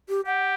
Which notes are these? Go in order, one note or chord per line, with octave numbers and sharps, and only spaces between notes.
G4
G4 F#5